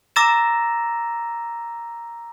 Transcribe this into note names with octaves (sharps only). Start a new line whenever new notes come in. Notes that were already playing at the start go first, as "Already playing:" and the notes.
A#5 D6 E6 A6 A#6 E7